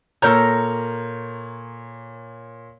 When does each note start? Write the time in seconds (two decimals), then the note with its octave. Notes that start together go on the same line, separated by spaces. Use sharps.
0.22 A#2 A4 A#4 C#5 A#5 G6